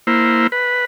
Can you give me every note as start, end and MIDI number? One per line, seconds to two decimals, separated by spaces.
0.07 0.47 58
0.07 0.47 64
0.07 0.47 72
0.52 0.85 71